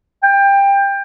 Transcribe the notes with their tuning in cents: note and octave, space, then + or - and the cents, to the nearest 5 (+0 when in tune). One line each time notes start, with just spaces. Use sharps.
G5 +20